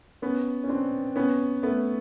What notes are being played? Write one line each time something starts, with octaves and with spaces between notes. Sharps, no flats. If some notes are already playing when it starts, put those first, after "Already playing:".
B3 C#4
C#4
C4 D4
B3 C#4
A3 B3